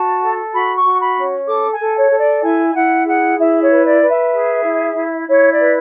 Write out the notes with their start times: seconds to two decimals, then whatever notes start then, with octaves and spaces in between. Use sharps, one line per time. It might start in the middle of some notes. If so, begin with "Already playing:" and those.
Already playing: F#4 A5
0.21 A4
0.53 F#4 B5
0.76 C#6
0.84 F#4
1.01 B5
1.15 C#4
1.47 A4 D6
1.72 G#5
1.79 A4
1.95 C#5
2.11 A4
2.19 D5
2.42 E4 G#5
2.74 E4 F#5
3.06 G#4 F#5
3.38 E4 E5
3.61 C#5
3.69 B4
3.85 D5
4.00 B4
4.08 E5
4.33 G#4
4.63 E4
4.95 E4
5.28 E4 C#5
5.51 D5
5.60 B4